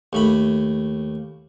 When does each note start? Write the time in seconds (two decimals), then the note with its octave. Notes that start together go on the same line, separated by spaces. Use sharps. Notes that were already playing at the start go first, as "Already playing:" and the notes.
0.13 D#2 A3 B5